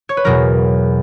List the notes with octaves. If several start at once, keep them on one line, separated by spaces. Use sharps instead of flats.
C#5
B4
E2 B2 F#3 A#4